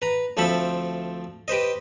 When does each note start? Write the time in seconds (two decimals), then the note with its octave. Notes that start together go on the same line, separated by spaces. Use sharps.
0.02 B4 A#5
0.37 D2 F3 A3 C4 A4 B5
1.48 G4 B4 C5 D#5